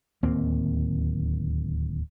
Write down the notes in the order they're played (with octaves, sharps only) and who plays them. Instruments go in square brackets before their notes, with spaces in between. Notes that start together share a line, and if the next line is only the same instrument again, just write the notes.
[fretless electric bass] D1 D#2 A#3 C4